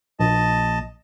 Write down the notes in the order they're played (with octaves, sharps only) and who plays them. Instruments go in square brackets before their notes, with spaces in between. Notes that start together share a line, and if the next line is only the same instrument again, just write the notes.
[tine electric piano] A#1 [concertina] D#5 A5